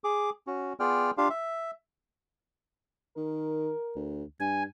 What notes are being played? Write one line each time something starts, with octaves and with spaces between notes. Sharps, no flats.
G#4 D6
C#4 F#4
B3 F4 G#4 D5 G5 F6
D4 F4 G4 F5
E5
D#3 A#4
D2
G2 G#5